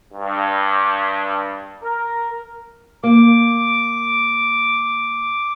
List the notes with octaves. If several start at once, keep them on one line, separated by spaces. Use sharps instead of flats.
G2
A#4
A#3 D6